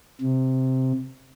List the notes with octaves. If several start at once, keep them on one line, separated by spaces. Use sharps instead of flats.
C3